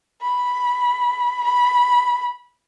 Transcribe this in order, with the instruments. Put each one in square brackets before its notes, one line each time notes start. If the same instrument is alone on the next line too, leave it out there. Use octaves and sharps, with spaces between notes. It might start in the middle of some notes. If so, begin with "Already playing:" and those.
[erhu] B5
B5